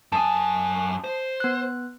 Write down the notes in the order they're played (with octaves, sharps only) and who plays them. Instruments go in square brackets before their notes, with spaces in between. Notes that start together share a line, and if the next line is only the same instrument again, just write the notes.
[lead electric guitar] F#2 G#5 [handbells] A5 D#6
[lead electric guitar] C5
[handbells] B3 F#6